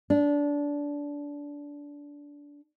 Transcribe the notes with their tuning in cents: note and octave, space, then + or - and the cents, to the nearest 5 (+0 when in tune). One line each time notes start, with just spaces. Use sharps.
D4 -20